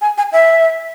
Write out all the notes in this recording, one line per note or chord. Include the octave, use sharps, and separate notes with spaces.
G#5
G#5
E5